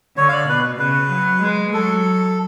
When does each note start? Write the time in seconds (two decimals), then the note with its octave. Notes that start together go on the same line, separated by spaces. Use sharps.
0.17 D3 C#5
0.29 F5
0.33 D5
0.49 B2 B4
0.79 C#3 B4
1.10 F#3
1.42 G#3
1.73 F#3 A4